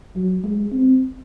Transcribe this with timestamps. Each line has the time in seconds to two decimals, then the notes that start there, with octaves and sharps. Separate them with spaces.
0.16 F#3
0.44 G#3
0.72 C4